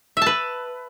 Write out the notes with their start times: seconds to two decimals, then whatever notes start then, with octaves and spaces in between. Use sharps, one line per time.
0.17 E5
0.22 A5
0.26 B4